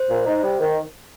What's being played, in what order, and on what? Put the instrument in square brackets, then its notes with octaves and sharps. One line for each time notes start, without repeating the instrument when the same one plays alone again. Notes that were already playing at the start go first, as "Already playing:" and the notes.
Already playing: [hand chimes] C5
[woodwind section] A#2
D#4
G3
D#3